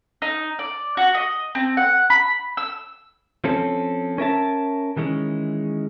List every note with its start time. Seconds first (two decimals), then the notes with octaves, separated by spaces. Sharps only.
0.22 D#4
0.59 D5
0.97 F#4
1.15 D#5
1.55 C4
1.77 F#5
2.10 B5
2.57 E6
3.44 F3 C4 C#4 A4
4.18 C#4 A#4 E5 A5
4.97 D#3 E3 G#3 C#4